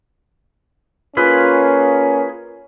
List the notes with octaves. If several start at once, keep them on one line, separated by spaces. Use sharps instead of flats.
A#3 C#4 F4 G#4 B4